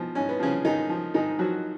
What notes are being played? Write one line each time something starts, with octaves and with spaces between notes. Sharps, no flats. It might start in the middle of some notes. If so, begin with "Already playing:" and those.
Already playing: G#2 B2 F3
G#2 C#4
B3
C#3 F3 C#4
G#2 D#3 D#4
F3
G#2 D#3 D#4
F3 F#3 F#4